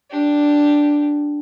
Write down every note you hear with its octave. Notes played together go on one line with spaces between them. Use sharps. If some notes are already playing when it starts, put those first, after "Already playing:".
D4 G4